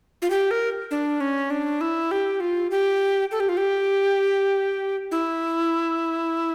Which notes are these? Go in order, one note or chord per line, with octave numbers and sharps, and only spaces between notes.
F4
G4
A#4
D4
C#4
D4
E4
G4
F4
G4
A4
G4
F4
G4
E4